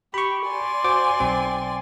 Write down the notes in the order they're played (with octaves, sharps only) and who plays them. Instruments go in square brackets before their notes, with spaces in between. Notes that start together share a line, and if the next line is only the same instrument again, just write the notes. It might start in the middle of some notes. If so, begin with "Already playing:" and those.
[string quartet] G4 [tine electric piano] B5 C#6
[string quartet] D5 G#5 C6
[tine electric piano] F#4 C5 D6
B1 C4